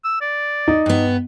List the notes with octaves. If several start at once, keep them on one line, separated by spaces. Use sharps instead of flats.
E6
D5
D#4
G2 B3